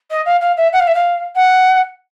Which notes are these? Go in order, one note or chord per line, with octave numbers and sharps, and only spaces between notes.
D#5
F5
F5
E5
F#5
F5
E5
F5
F#5